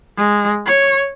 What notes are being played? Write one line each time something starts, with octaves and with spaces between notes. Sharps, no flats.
G#3
C#5